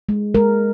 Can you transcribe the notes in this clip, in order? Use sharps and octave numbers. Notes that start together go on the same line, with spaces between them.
G#3
G#3 A#4